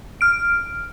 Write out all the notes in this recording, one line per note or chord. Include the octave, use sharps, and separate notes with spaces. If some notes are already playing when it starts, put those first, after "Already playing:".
F6 D7